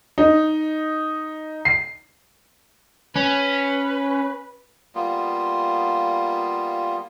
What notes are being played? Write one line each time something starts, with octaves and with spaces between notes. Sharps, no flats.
D#4
C7
C#4 B4
G3 A#3 B3 F4